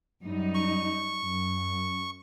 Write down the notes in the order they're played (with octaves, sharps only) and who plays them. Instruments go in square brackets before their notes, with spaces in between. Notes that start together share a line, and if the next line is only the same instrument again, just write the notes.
[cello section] F#2 G3 D#4
[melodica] C#6
[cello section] F#2